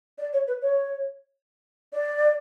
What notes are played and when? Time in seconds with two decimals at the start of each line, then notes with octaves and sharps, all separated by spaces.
0.18 D5
0.33 C#5
0.47 B4
0.62 C#5
1.93 D5